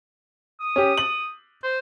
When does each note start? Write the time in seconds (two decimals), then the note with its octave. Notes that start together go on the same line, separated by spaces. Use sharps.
0.60 D#6
0.76 C#4 G4
0.97 F#7
1.63 C5